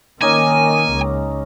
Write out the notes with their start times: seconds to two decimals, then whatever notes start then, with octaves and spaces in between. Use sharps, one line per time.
0.22 D#3 A#3 C#4 D#4 G#5 D6
0.90 C#2